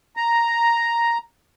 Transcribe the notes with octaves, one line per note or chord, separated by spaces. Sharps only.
A#5